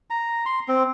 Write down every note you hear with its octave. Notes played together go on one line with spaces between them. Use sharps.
A#5
C6
C4